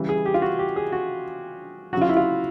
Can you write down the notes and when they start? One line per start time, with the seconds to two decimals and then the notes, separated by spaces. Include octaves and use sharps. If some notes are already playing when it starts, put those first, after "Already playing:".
Already playing: C#3 E3 G3
0.09 G#4
0.26 G4
0.34 F4
0.42 F#4
0.59 G4
0.76 G#4
0.92 F#4
1.93 F#3 F#4
1.97 C#3 F4
2.09 E4
2.17 F4